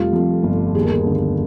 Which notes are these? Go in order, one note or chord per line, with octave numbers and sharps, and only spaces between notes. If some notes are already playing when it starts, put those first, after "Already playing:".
Already playing: F1 G3 F4
F2
G1
D#2 G#4
A#4
G#4
D3